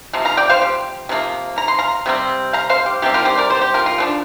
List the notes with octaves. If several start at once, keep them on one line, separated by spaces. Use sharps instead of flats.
C3 F3
F5 A#5
D5 G5
C5 F5
G4
C3 F3 A#3
A#5
C6
F5 A#5
C3 G3 C4
F5 A#5
C5 F5
G4
C3 G3 C4 G4
F4 A#4
G4 C5
A#4 D5
G4 C5
G4
F4 A#4
F4 A#4
D3 F3 D4